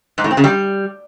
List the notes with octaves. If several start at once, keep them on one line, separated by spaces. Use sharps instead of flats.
G#2
A2
C4
C#3
G3